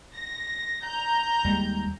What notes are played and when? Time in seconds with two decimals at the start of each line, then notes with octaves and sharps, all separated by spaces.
0.14 A#6
0.83 A#5 G6
1.45 D#2 G3 G#3